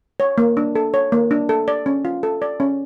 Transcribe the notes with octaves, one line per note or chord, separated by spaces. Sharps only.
C#5
A#3
D4
A4
C#5
A#3
D4
A4
D5
C#4
F4
A4
D5
C#4